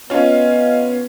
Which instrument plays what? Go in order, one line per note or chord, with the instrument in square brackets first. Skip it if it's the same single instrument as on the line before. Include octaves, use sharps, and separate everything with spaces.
[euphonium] B3 [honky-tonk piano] C#4 F4 [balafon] C#5 [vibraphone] D#5